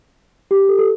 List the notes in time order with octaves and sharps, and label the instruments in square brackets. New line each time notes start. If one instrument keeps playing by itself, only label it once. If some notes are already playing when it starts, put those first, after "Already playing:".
[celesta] G4
A4
A4